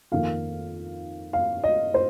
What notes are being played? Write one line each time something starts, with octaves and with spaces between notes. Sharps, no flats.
F2 D#3 A#3 F5
F5
D#5
C5